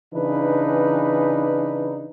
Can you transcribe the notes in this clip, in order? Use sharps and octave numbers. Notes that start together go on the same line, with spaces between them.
C#3 E3 D4 D#4 B4